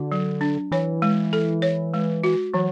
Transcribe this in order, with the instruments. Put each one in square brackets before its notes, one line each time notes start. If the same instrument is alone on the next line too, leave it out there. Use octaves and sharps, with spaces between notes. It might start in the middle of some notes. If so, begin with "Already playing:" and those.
Already playing: [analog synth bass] D3 [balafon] F#4
[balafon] F#3
D4
[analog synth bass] E3 [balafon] C#5
[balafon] G#3
A4
C#5
G#3
F#4
[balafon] E3 [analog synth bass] F#3